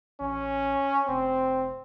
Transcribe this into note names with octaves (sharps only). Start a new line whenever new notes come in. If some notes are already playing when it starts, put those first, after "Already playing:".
A1 C#4
F1 C4